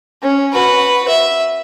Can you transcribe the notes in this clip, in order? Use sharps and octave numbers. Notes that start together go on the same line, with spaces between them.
C#4
F#4 B4
E5